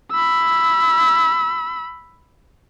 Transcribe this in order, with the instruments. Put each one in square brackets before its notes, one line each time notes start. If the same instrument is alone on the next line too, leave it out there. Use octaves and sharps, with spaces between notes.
[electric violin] B5 E6